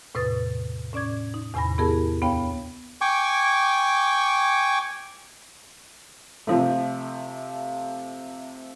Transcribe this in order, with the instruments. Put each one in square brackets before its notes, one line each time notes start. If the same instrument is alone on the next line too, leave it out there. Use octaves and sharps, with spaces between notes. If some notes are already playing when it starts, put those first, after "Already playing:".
[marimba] E2 A2 C3 B4 D#6 A6
A2 C#4 D5 D6 G#6
D#4
E2 A2 C3 G#5 B5 A#6
B3 E4 G4 G#4 A#4 A5
D2 B3 C#5 F5 G5
[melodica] G5 G#5 C#6 D6
[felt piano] C3 F3 A3